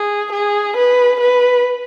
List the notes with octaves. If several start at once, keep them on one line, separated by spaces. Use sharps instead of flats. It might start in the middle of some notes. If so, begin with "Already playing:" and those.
Already playing: G#4
G#4
B4
B4